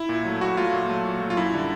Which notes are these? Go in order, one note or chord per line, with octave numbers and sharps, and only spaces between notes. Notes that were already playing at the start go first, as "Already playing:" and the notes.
Already playing: E4
A#2
F#3 A3
A#2 F#4
F#3 A3 F4
A#2
F#3 A3
A#2
F#3 A3
F4
F#2 E4
D3 G3